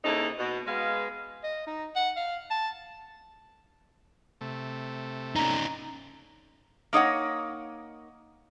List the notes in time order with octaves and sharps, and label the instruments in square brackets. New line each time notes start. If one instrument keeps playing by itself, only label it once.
[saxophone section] C#3 A#3 C4 D#4 E4 A4
B2
G#3 B3 F5
[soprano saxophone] D#5
D#4
F#5
F5
A5
[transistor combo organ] C3 A3
[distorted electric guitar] C#4 D#4 [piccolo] A#5
[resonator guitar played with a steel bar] A#3 D#4 C#5 F#5